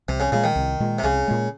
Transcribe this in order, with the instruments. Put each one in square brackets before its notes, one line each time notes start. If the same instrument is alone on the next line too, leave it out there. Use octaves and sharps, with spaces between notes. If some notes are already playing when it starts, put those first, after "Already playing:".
[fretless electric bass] C2 [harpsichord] C3
[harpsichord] C#3
[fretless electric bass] A#2 G#3 [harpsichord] C#3
[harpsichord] D#3
[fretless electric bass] C2
A#2 G#3
[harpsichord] C3
[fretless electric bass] C2 [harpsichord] C#3
[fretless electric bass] A#2 G#3